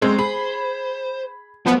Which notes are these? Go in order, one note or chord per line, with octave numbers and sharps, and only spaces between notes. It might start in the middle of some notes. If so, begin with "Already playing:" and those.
F#3 G#3 C4 C5
G#4 B5
F3 F#3 A3 B3